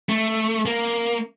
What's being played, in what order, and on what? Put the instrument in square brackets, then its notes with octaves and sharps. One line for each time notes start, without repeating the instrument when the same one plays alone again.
[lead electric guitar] A3
A#3